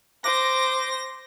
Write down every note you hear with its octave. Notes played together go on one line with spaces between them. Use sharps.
C5 D6 A#6